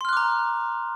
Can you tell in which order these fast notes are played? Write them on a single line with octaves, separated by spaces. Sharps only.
C6 F6 F#6 D6 A#5